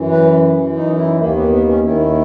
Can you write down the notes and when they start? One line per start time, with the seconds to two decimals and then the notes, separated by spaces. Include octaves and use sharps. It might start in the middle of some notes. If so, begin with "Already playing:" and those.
Already playing: F#2 E3
0.11 B4
0.54 F#2 E3
0.76 D#4
0.98 E4
1.19 D#2 D#3 A#3
1.36 B3
1.52 B3
1.68 C#4
1.84 D#2 D#3 E4